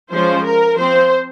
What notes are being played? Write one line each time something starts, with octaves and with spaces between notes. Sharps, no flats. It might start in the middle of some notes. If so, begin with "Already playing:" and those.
F3 G#3 C#4 C5
A#4
F3 C4 C5